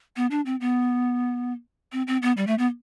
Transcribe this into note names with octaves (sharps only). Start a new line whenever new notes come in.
B3
D4
C4
B3
C4
C4
B3
G3
A3
B3